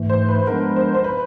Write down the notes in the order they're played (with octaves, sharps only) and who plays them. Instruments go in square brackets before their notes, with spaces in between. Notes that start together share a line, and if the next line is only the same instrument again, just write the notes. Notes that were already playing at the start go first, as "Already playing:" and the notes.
Already playing: [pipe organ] G#2 E3 A3
[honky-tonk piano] C5
B4
[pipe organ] F3 G#3 B3 D4 [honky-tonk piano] A#4
[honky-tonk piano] C5
C5
B4